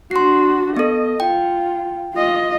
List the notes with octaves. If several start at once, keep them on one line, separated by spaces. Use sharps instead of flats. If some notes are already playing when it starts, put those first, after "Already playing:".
D4 F#4 C6 C7
B3 A4 D#5
F4 G5
F4 D#5